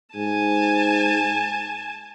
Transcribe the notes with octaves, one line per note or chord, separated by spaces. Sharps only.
G#2 G#5 A5